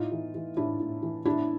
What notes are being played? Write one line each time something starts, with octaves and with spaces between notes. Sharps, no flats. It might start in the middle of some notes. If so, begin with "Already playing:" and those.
Already playing: A2 D#4 F4
E3
E3
A2 D4 E4
A2
E3
A2 D4 E4